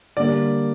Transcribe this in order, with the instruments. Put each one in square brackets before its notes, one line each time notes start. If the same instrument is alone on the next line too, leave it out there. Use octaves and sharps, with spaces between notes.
[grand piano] D3 G3 A#3 D5